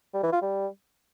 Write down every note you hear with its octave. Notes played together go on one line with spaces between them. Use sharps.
G3
E3
F4
G3